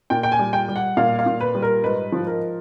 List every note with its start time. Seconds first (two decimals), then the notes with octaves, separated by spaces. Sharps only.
0.10 A#2 G5
0.23 G5
0.32 G#5
0.39 G3
0.53 G5
0.68 G3
0.76 F#5
0.97 A#2 F5
1.19 F5
1.26 A#2
1.41 B4
1.55 G3
1.62 A#4
1.83 G#2 B4
2.12 F3
2.27 A#4